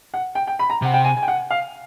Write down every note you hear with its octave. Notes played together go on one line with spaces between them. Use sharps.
F#5
G5
G5
B5
A#5
C3 F#5
G5
G#5
G#5
G5
F#5
F5